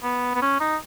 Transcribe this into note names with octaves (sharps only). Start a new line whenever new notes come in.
B3
B3
C#4
D#4